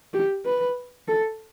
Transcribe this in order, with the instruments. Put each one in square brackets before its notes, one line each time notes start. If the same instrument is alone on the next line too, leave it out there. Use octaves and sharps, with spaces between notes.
[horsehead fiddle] G4
B4
A4